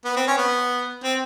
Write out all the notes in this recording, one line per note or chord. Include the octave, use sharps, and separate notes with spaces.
B3
C4
C#4
B3
C4